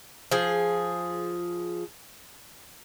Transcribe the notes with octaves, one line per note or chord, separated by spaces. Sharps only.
F3 G#4